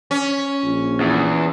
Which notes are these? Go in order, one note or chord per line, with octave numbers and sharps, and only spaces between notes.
C#4
A#1
E2